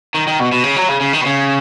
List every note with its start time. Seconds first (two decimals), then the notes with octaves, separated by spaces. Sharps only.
0.15 D#3
0.27 D#3
0.40 B2
0.52 B2
0.64 C#3
0.76 F#3
0.88 C#3
1.01 C#3
1.13 D#3
1.21 B2
1.26 C#3